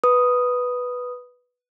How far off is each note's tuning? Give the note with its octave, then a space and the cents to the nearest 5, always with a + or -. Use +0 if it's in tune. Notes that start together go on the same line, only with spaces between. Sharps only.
B4 +0 D#6 +0